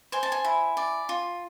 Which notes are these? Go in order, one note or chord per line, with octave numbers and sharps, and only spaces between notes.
C5 G#5
A5
G#5
E4
D5
F4